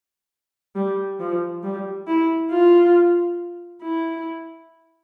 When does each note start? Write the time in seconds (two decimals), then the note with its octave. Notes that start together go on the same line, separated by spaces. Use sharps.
0.75 G3
1.20 F3
1.63 G3
2.07 E4
2.50 F4
3.82 E4